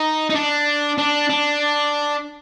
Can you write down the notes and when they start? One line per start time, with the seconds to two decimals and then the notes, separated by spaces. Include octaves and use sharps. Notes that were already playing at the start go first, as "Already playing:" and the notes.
Already playing: D#4
0.30 D#4
0.35 D4
0.98 D4
1.29 D4